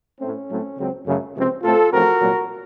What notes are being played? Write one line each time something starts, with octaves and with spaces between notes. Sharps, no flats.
A2 A3 C4 C#4
A2 F#3 A3 C4
C#2 C#3 F#3 C4
F#2 C#3 A3
C#2 C3 F3 C4
A2 A3 C4 F4 A4
A1 A2 F3 C4 F#4 A#4
C2 A#2 F#3